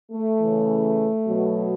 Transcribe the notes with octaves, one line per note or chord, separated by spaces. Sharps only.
A3
C#3 E3
B2 F#3